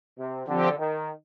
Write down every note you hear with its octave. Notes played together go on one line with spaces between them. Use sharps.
C3
D3 F3 C4 G4
D#3